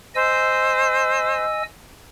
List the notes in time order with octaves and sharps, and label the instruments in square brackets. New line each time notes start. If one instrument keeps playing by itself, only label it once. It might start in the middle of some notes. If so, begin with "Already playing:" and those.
[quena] C5 [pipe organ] D#5 G#5 E6